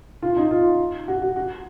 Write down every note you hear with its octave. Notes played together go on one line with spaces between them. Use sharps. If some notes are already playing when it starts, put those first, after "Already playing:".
F4
D#4
F4
F#4
F#4
F#4